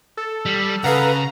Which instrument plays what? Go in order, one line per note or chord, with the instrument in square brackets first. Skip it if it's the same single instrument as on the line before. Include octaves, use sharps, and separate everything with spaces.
[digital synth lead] A4
[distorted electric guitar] G3
[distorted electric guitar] C#3 [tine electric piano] A4 F5 F#5 [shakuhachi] B4 [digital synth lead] A#5